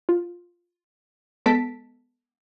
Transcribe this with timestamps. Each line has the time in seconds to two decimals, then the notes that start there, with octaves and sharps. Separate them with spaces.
0.09 F4
1.46 G#3 B3 A4 A5 B6 D7